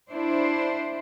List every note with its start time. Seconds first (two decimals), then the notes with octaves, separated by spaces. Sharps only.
0.10 D4 E4 C5